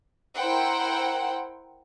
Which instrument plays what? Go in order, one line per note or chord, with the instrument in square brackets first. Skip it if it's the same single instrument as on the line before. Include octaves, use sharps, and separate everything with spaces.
[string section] E4 A#4 C5 F#5 G5